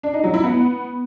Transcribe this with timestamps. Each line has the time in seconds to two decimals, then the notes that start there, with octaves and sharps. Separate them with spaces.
0.03 D4
0.14 D#4
0.24 F#3
0.34 E4
0.44 B3